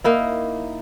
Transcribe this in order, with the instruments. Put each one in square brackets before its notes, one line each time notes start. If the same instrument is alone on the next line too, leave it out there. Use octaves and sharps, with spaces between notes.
[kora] A#3 D#4 E4